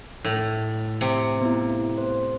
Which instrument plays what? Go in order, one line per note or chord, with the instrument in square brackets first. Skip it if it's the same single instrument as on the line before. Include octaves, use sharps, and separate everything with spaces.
[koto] A2
C3
[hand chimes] B3 E4
C5